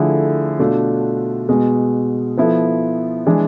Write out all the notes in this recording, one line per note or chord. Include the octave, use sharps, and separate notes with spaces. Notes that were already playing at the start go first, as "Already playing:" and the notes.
Already playing: D3 F3 A3 E4 G#4
B2 A3 D4 F4
B2 G#3 B3
F3 B3 E4 A4
E3 G#3 D4